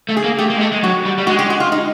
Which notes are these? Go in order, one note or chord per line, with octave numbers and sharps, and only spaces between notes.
A3
G#4
A#3
A3 G4
A#3
G#3
A3
G#3
F#3 F#4
G3
G3
G#3 F#4
G4
F#4
F4
D#4